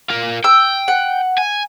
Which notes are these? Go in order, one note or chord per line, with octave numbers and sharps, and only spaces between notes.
F4 A#4
G5 E6
F#5
G#5